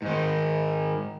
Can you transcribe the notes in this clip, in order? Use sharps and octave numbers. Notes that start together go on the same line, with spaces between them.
G#2 D#3